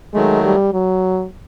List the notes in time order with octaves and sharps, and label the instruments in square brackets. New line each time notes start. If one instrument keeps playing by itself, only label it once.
[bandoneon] D#3 F#3 A3 [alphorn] G#3
[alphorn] G3
F#3